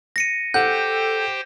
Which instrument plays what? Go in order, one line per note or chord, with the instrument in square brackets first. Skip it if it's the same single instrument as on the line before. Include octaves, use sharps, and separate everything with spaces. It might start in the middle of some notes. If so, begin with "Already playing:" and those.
[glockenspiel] A#6 C#7 D#7
[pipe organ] G4 C5 G5 [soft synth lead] A4 [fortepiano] F#5 [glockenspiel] G6